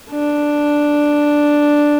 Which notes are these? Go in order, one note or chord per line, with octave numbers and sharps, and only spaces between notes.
D4